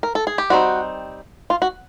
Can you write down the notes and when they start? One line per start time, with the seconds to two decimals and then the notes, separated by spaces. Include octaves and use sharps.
0.03 A#4
0.15 A4
0.27 G#4
0.38 G4
0.50 G3 C4 D#4 F#4
1.50 F4
1.62 F#4